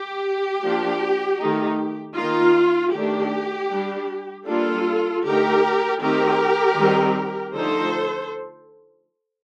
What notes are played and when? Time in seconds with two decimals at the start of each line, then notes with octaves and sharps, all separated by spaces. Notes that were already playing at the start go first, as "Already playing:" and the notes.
Already playing: G4
0.63 F3 A#3 D4
1.40 D#3 A3 D#4
2.16 D#3 A#3 D#4 F4
2.93 D#3 A3 D4 G4
3.71 G3 D4
4.47 G3 A#3 D4 F4 A4
5.24 D3 A3 D#4 G4 A#4
6.01 D#3 A3 C4 D#4 G4 A#4
6.78 D#3 G3 C4 D#4
7.54 D3 F3 A3 D#4 A4 C5